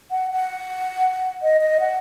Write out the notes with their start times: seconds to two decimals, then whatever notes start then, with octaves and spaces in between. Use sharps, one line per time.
0.11 F#5
0.31 F#5
1.43 D#5
1.61 D#5
1.80 F#5